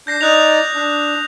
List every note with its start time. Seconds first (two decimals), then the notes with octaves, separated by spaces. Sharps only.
0.07 D4 G6 A#6 C7
0.21 D#4 D5 D#6 F#6 F7
0.75 D4